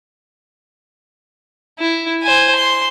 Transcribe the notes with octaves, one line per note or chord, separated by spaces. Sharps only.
E4
C5 G#5
C6